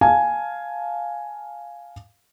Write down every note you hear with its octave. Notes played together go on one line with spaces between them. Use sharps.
F5 G#5 A5